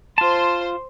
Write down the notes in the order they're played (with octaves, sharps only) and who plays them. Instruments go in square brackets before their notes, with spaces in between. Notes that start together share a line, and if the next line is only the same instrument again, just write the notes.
[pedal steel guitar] F4 A5 [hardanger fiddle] C5 C6